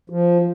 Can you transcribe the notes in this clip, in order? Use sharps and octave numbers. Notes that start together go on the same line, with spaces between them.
F3